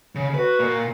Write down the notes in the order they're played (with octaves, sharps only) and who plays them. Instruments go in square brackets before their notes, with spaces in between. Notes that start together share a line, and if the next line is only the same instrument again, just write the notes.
[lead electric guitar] C#3
[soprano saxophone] F#4 [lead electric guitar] B4
[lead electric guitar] A#2 A#3